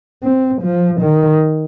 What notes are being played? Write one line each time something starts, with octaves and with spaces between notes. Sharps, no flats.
C4
F3
D#3